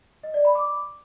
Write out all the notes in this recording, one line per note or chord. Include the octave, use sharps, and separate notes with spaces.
D#5
D5
B5
D6